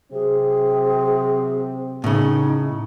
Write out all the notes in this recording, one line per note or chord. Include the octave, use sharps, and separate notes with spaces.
C3 F#3 C4 G#4
A2 C#3 D#4